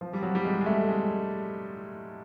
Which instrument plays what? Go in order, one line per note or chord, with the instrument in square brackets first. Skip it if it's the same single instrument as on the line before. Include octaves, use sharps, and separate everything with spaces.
[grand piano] F3
G3
F#3
G3
G#3
G#3
A3
G#3